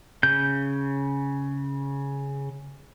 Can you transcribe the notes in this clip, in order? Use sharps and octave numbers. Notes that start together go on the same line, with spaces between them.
C#3 G6